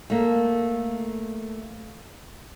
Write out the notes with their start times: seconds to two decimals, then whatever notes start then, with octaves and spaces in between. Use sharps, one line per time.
0.10 A3 A#3